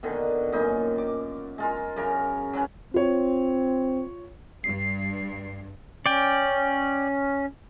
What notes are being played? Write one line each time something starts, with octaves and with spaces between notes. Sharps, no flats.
B2 D3 D#3
F#2 A#2 D#4
D6
G#3 F4 A#4
F#2 C#3 A#4 C#5
F#3 C#4 B4 C#5
C4 F4 C#5
G2 C7
C#4 D5 G5